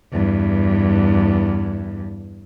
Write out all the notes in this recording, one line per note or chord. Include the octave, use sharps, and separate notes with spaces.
E2 G2